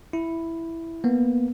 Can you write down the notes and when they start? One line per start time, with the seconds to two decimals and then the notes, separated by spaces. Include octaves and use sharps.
0.13 E4
1.04 A#3 B3